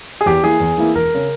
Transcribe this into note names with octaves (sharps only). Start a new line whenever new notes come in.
G#4
E2 G4
E3 A#3 E4 G#4
E2
E3 A#3 E4
E1 A#4
C#3